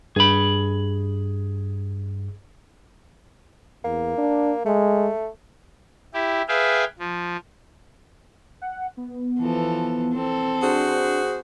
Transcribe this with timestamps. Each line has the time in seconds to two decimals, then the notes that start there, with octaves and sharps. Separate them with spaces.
0.16 G2 G#4 B5
3.84 E2 A#3
4.18 D4
4.65 G#3 A3
6.14 E4 G4
6.48 G#4 B4 E5 F5 G5
6.99 F3
8.62 F#5
8.97 B3
9.39 E3 F3 A4
10.13 C4 A4
10.63 D4 F#4 G#4 C5